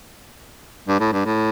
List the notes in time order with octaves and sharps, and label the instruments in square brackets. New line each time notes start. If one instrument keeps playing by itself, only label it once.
[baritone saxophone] G2
A2
G2
A2